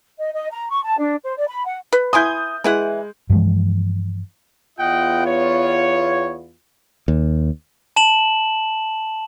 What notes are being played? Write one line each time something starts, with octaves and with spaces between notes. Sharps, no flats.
D#5
D#5
A#5
C#6
A5
D4
C5
D5
B5
F#5
B4
E4 G#5 C6 D#6 G6
E3 G#3 E4 F#5
G2 E3 F3 G#3
E2 B3 F4 D#5 F#5 G5
C#5
D#2
A5 E7 F#7